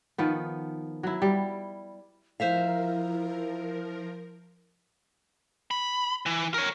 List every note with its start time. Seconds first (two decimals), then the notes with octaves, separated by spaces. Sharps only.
0.18 D#3 F3 B3
1.03 F#3 E4
1.22 G3
2.40 F3 E4 A#4 C5 E5 F5
5.71 B5
6.26 E3
6.54 A#4 C#5